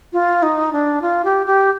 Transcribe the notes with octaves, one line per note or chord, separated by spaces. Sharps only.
F4
D#4
D4
F4
G4
G4